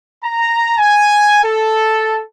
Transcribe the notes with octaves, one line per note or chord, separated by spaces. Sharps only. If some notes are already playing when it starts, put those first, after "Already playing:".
A#5
G#5
A4